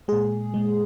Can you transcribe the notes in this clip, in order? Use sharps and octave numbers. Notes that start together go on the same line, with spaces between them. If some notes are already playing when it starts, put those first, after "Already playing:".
A#2 G#3 G#4
A#2 G#3